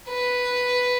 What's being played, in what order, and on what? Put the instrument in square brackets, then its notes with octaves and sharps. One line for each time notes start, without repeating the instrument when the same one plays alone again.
[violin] B4